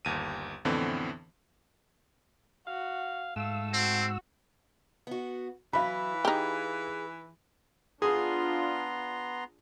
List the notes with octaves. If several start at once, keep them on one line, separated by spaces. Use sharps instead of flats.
G1 D#2 D#7
F2 A2 D3 E3 B3 C4
F#4 F5
G#2 A3 F5 E6
C4 F#4
B3 F#4
E3 F#3 E4 F5 B5
D#4 G4 G#4
B3 D4 F4 G#4 A#5 C6